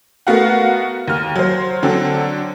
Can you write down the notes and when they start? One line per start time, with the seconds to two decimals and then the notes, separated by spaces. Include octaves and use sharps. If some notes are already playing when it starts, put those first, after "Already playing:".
0.27 A3 B3 F#4 A#4 F5 F#5
1.08 D#2 F6
1.36 F#3 C5
1.83 D3 F#3 C4 D4 A4